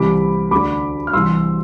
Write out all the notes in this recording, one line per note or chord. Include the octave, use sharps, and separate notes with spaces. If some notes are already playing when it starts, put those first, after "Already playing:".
Already playing: C2 C3 E3 B5 D6
D2 D3 B5 D6
F6
C2 C3 E3 C6 E6